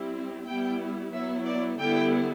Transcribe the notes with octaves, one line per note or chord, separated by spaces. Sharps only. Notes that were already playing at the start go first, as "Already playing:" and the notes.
Already playing: G3 C4 E4
G3 B3 E4 G5
F#3 B3 E4 E5
D5
D3 G3 B3 E4 G5